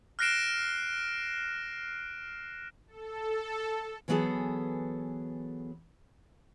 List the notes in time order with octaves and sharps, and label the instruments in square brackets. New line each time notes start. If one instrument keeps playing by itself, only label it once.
[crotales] F6 F#6 A#6 C7 D7 E7
[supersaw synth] A4
[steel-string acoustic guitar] E3 F#3 B3 G#4 A4